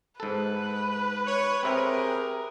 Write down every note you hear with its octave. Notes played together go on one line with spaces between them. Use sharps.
G#2 A4 B4
C#5
C4 G4 G#4 A#4 E5